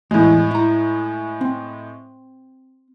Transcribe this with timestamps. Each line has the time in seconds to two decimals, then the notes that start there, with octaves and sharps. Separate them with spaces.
0.11 E2 A2 G#3
0.51 E4 A#5
1.41 C4